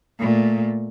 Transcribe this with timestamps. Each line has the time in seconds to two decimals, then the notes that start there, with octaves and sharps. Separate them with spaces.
0.19 A#2 A3